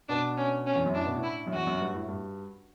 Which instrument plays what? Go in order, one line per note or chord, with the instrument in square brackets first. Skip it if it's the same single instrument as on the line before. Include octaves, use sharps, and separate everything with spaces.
[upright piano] B2 [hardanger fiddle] D4
[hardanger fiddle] C#4
C#4
[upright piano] E2
F#2
[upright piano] A2 [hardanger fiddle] D4
[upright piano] B2
A2
[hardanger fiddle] E4
[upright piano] F#2
[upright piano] E2 [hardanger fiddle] F#4
[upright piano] F#2
G2
A2
G2